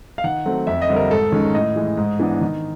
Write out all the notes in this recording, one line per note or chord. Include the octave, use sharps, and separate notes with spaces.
F5
D#3 F#5
F#3 A3 C4
F2 E5
D#5
D3 G3 C4
A#4
G#2 A4
D#3 G#3 C#4
A2 D#5
E3 G#3
G#2
E3 G#3 B3 D4
D#3